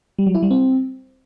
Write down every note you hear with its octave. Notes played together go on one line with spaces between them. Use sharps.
G3
F#3
E4
G3
C4